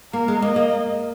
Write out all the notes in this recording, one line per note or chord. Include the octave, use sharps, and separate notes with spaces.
A#3 A#4
G#3
A#3 D#5
A#3